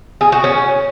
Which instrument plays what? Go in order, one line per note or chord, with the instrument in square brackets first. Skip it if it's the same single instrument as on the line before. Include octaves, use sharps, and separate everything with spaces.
[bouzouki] G#4
F#4
C#4